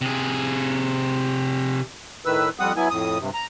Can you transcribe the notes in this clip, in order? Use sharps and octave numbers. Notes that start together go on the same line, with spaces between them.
C3 G#4
A2 D#3 B4 E6
F2 G3 C4 F#5 D#6
F#3 B3 E4 G#5
F2 A2 D#6
G2 C3
A#5